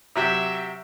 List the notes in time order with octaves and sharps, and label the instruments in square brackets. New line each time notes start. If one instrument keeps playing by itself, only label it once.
[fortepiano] C3 F#3 G4 [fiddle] E5